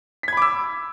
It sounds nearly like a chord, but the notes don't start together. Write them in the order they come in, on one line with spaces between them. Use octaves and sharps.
B6 G#6 B5 D6 E6